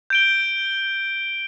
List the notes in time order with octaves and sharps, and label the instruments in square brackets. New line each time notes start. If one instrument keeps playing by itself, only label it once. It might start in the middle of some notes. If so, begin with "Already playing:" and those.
[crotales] G6 D7 G7